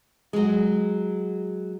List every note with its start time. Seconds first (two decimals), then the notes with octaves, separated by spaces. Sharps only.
0.33 F#3 G#3